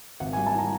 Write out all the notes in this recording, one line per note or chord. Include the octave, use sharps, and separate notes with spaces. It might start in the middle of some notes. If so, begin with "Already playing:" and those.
G#1 F#5
G#5
G3
A5
E3 A#5